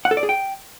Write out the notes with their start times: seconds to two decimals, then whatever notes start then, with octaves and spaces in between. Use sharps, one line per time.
0.05 F#5
0.11 A4
0.17 D5
0.23 G#4
0.29 G5